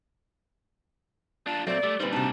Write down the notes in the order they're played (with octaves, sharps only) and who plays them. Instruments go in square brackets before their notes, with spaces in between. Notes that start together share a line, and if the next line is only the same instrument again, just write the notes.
[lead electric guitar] D4 F4 [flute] A5
[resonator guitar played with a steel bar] A#2 A3 [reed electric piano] F#3 A6 [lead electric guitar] C4 [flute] D5
[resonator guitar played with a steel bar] G3 [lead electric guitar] A3 [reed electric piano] D6
[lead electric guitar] A#2 G3 [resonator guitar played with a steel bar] D3 C4 C5 [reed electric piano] D#4 B4
[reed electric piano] C3 C4 D4 [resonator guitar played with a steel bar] D#4 F#4 [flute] A5